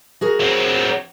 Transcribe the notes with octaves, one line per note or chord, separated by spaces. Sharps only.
F#4 G#4 A#4
F#3 C4